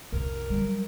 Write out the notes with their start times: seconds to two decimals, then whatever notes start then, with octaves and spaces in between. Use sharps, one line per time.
0.12 C2 F2 A#4
0.50 F#3 G3